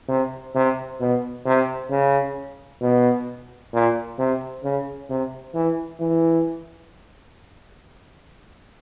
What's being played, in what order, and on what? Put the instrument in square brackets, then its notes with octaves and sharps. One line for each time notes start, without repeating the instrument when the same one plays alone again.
[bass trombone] C3
C3
B2
C3
C#3
B2
A#2
C3
C#3
C3
E3
E3